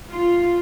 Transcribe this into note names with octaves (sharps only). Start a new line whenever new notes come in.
F4